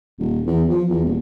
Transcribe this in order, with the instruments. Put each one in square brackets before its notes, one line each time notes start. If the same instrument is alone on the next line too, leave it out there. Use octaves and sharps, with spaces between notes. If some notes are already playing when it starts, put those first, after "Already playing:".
[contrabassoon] D#1
E2
F3
E2
D#1